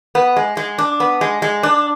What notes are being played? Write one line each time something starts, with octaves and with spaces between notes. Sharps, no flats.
B3
G#3
G#3
D4
B3
G#3
G#3
D4